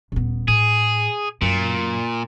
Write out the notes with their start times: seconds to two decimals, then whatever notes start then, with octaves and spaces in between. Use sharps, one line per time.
0.12 D#1 B3
0.48 A2 G#4
1.42 F#2 A#2